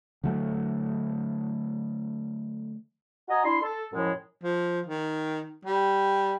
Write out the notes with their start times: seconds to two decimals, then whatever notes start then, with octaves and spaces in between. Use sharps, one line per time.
0.24 D3 F#3 A3
3.28 F#4 D#5 G#5 A#5
3.44 D4 E4 C6
3.62 A4
3.93 F#2 A2 F3 G#3
4.43 F3
4.86 D#3
5.65 G3